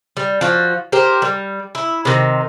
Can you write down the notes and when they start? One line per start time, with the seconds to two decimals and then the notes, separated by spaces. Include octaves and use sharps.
0.17 G3
0.41 F3 F#4
0.92 G4 A#4 C5
1.22 G3
1.75 E4
2.05 C3 D#3